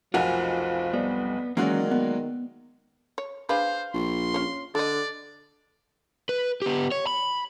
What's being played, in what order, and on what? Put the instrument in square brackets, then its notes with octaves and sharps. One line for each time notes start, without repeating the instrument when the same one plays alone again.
[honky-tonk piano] F1 B1 F#5 [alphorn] F3 [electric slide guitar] F4 [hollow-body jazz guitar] F#4 A#4 G#5
[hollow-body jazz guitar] G3 [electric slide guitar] B3
[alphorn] D#3 [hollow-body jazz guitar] E3 C#4 [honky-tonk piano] F#3 G#3 F#4 [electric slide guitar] A#3 D5
[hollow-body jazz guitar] B3
[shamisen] C#5
[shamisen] D4 G#4 B4 [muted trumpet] C5 [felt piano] F5
[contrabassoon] A#1 [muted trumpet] C6
[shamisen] C#4 C#5
[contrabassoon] D3 [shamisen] A4 D#5 [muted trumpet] D5
[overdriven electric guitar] B4
B3 G4
C#5
B5